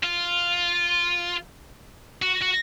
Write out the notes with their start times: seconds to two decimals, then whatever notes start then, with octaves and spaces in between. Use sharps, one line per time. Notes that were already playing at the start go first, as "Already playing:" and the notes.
0.03 F4
2.22 F#4
2.41 F#4